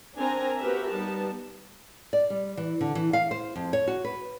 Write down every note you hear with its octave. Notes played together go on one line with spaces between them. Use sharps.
C4 D4 A#4 G#5 A#5
B3 F#4 G4 A#4 B4 E5
G3 B3 D#4 A5
D5
G3
E3
D3
E3
F5
C5
F2
C#5
F#4
B4